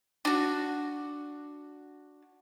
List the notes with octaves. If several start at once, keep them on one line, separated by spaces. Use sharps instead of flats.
D4 F#4